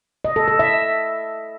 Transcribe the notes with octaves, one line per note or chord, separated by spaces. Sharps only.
D#5
A4
A4
E5